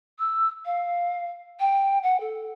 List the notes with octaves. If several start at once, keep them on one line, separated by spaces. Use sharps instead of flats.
E6
F5
G5
F#5
A4